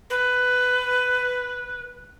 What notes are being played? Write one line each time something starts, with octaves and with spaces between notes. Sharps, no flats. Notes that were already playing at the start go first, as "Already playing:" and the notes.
B4